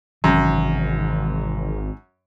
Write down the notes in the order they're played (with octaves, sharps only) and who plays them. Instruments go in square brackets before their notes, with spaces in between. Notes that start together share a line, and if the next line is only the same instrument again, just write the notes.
[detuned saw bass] G#1 [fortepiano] F#2 [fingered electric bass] C3 D#3 E3